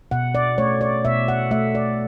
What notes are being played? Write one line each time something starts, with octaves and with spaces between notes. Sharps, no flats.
B2 F#5
D5
A3 C#5
D5
B2 E5
F#5
A3 E5
D5